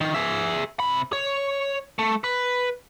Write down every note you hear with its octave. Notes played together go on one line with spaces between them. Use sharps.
D#3
G#4 E5
C3 B5
C#5
A3
B4